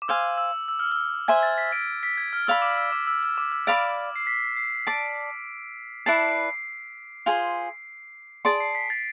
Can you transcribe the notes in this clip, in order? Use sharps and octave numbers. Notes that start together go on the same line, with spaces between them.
D6
C5 F5 G#5 E6
E6
E6
F6
E6
C5 E5 G#5 G#6
A6
B6
D7
B6
G#6
F6
D5 F5 B5 E6
D6
E6
D6
E6
E6
D6
E6
D5 F5 B5 D6
C7
B6
C7
D5 A5 D6 D7
E4 B4 D5 A5 C7
F4 G#4 C5 G#5
G#4 D5 A5 C6 D7
C7
B6
A6